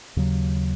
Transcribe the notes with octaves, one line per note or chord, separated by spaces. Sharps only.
D#2 C#3 F#3